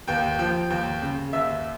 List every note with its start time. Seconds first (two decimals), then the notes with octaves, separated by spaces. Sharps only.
0.08 D#2 G5
0.39 F3 G5
0.70 D#2 G5
1.02 C#3
1.33 D#2 E5